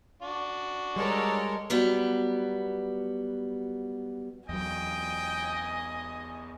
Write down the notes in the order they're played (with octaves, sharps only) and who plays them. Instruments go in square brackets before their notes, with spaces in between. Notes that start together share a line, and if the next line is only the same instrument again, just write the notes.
[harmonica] D4 F#4
[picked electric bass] G3 [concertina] G#3 [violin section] A4 A#4 C#5
[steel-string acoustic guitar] F#3 G3 B3
[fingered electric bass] E2 F#3 [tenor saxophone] D#5 [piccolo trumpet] G5 [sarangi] G#5